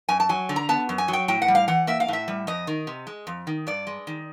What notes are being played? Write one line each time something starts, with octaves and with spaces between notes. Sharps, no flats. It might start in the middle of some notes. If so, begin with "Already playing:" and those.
F#2 G#5
A5
F#3 G#5
D3
A#5
B3 A5
F#2
G#5
F#3
G5
A2 G5
F#5
G3
F5
E3 F#5
A#3 E5
F5
A2 E5
G3
F2 D#5
D#3
C3
G#3
F2
D#3
G2 D5
G#3
D#3